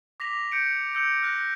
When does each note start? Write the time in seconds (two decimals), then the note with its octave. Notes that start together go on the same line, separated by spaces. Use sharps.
0.20 D6 A#6 B6 F7
0.52 G6 C#7 D7
0.94 E6 G6 C#7
1.23 F6 F#6 A#6